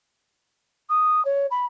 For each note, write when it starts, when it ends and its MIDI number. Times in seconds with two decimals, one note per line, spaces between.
0.89 1.23 87
1.25 1.46 73
1.50 1.65 83